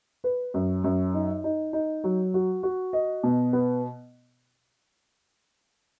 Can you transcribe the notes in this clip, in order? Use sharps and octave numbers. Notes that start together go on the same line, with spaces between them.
B4
F#2
F#2
D#4
D#4
D#4
F#3
F#4
F#4
D#5
B2
B3